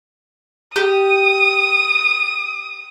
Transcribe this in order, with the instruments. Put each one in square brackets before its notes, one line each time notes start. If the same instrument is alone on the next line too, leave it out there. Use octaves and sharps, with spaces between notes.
[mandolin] G4 [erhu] D#6